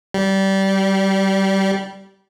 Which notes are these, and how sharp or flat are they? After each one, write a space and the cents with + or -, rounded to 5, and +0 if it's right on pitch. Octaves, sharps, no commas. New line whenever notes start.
G3 -20